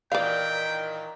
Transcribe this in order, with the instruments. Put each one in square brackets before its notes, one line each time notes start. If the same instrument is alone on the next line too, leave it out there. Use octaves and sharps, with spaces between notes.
[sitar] A#2 E3 [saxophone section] D#3 [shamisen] D5 F5 [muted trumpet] G5